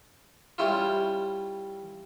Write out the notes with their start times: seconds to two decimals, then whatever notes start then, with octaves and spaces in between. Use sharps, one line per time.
0.58 G3 C#4 E4 F4